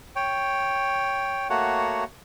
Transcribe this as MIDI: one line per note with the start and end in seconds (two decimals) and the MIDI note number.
0.16 1.48 73
0.16 1.48 79
1.50 2.04 57
1.50 2.04 58
1.50 2.04 66
1.50 2.04 73
1.50 2.04 78